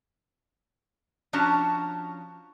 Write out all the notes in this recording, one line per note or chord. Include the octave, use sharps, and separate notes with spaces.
F3 C#4 D4 F#4 A5 A#5